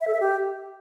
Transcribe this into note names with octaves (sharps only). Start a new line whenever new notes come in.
E5
A4
E5
G4